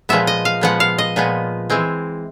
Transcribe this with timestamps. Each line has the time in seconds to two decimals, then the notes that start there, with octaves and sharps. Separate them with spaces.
0.09 A#2 F3 G#3 B3 E5
0.27 D#5
0.45 F5
0.61 A#2 F3 G#3 B3 F#5
0.80 F5
0.98 D#5
1.16 A#2 F3 G#3 B3
1.70 E3 G#3 C4